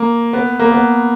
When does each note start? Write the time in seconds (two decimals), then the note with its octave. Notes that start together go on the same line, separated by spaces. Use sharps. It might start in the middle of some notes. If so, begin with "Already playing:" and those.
Already playing: A#3
0.33 B3
0.59 A#3
0.72 B3